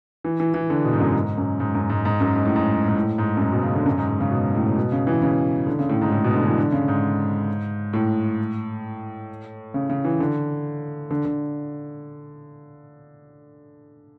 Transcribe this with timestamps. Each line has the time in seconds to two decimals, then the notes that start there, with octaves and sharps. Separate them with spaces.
0.24 E3
0.40 E3
0.54 E3
0.70 D3
0.85 B2
0.93 G#2
1.00 F#2
1.15 G#2
1.38 F#2
1.60 G#2
1.75 F#2
1.90 G#2
2.05 G#2
2.20 F#2
2.36 G#2
2.45 A2
2.56 G#2
2.88 G#2
2.96 A2
3.18 G#2
3.37 F#2
3.41 G#2
3.52 B2
3.63 C#3
3.75 D3
3.86 F#2
3.98 G#2
4.08 G#2
4.20 C#3
4.31 B2
4.54 A2
4.66 A2
4.76 B2
4.92 C#3
5.07 E3
5.22 C#3
5.67 D3
5.79 C#3
5.89 A2
6.01 G#2
6.12 A2
6.24 B2
6.35 D3
6.46 E3
6.58 D3
6.72 C#3
6.88 G#2
7.93 A2
9.74 C#3
9.90 C#3
10.04 E3
10.20 D3
11.11 D3
11.25 D3